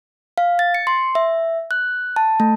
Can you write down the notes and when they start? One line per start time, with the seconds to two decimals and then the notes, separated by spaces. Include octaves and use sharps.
0.38 F5
0.59 A6
0.74 C#7
0.87 C6
1.15 E5
1.71 F#6
2.16 A5
2.40 A3